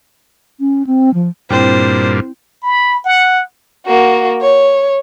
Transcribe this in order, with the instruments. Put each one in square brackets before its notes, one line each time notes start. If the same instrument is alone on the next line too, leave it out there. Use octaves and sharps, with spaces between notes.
[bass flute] C#4
C4
F3
[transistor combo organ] G2 A#2 [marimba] C4 E4 G5 [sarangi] C5
[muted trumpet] B5
F#5
[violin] A#3 F#4
C#5